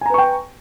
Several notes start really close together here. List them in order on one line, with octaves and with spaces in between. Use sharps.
G#5 A#5 B4 C#6 G5